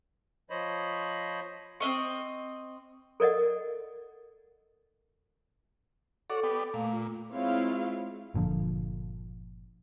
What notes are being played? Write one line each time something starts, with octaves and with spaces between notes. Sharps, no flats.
F3 C5 C#5 D#5 B5
C4 C#4 D#5 C#6
A4 A#4 D5 D#5 F#5
F#4 A4 C#5 D5
B3 G4 D5
A#2 A3 F5
F4
G#3 C4 E4 F4 C#5 F5
G1 A#2 D3 F3